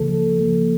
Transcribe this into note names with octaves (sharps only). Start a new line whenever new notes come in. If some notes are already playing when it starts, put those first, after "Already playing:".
Already playing: C#2 C#3 F3 A#3 A4
C#2 C#3 F3 A#3